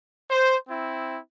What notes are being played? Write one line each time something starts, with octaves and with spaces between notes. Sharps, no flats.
C5
C4 E4